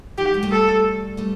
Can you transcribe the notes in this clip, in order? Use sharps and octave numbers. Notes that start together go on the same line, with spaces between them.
D#3 F3 G4
F#3 G#3
G3 A3
A4
G3 A3